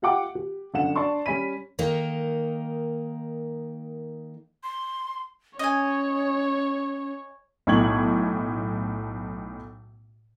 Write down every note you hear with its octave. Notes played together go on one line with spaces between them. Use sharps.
F4 G4 E5 F#5 G5 D6
G4
G1 F#2 F#5 E7
D4 D5 A5 C6 C#6
G3 C#4 G#5 B5 B6 D#7
D#3 A#3 D#4
C6
C#4 C#5 D#5 G#5
B1 A2 C#6 G#6 F#7